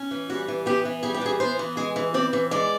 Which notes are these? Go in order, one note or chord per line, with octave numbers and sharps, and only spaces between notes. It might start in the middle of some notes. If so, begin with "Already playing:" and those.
Already playing: C#4
E3
G3 F#4
E3
B3 G4
E3
G3 G#4
G4
E3 G#4
B3 C5
E3
G#3 G#4
E3
C4 D5
E3
G#3 D5